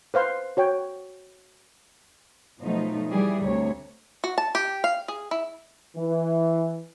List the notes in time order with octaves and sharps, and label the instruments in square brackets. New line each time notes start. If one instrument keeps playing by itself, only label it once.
[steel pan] B4 C5 F5 C6
F#4 C#5 G5
[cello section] B2 F3 F#3 A3 D#4
E3 G3 G#4
D2 C3 C#5
[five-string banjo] F#4
A5
G4
F5
G#4
E4
[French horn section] E3